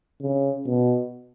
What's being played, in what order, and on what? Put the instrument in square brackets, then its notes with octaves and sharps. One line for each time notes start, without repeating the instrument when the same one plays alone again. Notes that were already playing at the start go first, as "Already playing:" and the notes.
[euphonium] C#3
B2